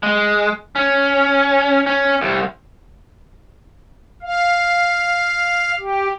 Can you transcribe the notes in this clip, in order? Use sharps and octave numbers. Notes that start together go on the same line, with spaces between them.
G#3
C#4
C#4
C2
F5
G4